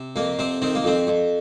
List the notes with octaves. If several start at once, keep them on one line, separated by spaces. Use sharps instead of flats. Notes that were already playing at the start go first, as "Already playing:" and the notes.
Already playing: C3
F2 A#3
C3 C4
D#3 C4
A#3
F2 C4
F2